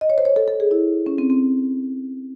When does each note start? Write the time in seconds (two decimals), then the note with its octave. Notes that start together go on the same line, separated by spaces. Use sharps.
0.01 D#5
0.10 C#5
0.18 C5
0.25 C#5
0.36 A4
0.48 A4
0.60 G#4
0.71 E4
1.06 C#4
1.18 C4
1.30 C4